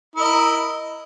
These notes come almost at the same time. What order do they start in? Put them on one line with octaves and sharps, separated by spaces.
E4 A#4 D#5